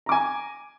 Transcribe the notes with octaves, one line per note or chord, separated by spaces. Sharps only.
G#5 A#5 D6